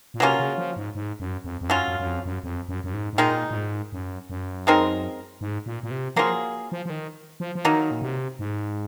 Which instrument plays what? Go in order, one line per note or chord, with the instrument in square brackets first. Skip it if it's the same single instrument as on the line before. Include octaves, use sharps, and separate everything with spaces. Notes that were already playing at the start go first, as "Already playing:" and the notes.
[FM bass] A#2
[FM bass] C3 [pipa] F#3 A#3 C#4 F4
[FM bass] C#3
F3
G#2
G#2
F#2
F2
F2
[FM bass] F#2 [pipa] F#3 C#4 F4
[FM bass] F#2
F#2
F2
F#2
F2
F#2
F#2
G#2
G#2
[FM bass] A#2 [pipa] D#3 G#3 D#4
[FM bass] A#2
G#2
F#2
F#2
[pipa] G#3 C4 D#4 A#4
[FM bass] G#2
A#2
A#2
C3
[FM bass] F3 [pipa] F#3 A#3 F4 G#4
[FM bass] F3
F3
D#3
F3
F3
[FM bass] D#3 [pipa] F#3 A#3 D#4
[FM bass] A#2
C3
G#2